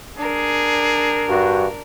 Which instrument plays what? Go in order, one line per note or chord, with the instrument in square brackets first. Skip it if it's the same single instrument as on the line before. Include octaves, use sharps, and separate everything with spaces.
[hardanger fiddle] D4 A#4 [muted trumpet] G#4
[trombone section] G2 F#4